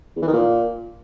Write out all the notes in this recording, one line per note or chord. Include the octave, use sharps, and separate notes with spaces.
E2
E3
D#3
A#2